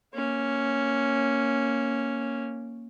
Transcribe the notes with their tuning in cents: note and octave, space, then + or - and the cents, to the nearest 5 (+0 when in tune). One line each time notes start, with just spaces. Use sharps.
A#3 +0 C#4 +0